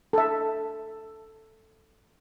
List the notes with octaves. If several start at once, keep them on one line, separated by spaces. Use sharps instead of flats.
A4 E5